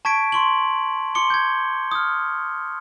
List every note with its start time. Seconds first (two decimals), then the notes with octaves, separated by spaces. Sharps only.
0.05 A5 C#6 G#6 B6 D7
0.32 C6 C#6 F#7
1.15 C6 D6 C#7 G7
1.30 G6 G#6
1.91 D#6 F6